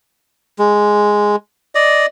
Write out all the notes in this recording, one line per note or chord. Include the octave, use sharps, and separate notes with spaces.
G#3
D5 D#5